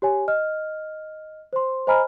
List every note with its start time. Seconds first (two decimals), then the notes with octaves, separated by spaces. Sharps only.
0.02 G4 C#5 G#5
0.28 D#5 F6
1.53 C5 C6
1.87 C5 D#5 G#5 A#5 B5 F6